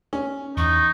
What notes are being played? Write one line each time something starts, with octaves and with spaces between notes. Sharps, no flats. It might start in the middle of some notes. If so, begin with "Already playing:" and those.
C#4
E2 D#4 C#6